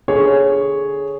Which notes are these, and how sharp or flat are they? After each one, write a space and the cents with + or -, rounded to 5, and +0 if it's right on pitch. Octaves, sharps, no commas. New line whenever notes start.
D3 +0 G#4 +0 C#5 +0